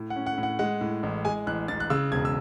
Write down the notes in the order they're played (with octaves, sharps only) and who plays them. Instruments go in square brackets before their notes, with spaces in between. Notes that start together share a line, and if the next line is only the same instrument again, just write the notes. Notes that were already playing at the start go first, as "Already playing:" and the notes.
Already playing: [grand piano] A2
F#5
C#4
F#5
A2
F#5
G#3 F#5
A2
A1
G#3 G#5
A1 F#6
A1 A6
F#6
C#3 E6
E1 G#6
E6